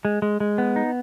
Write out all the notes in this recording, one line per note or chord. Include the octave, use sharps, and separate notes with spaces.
G#3
G#3
G#3
B3
D#4